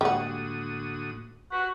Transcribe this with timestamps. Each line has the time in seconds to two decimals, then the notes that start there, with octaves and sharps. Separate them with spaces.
0.01 D2 A2 G3 G#3 A#3 F#4 F#5 D#6
1.52 F#4 G4 B4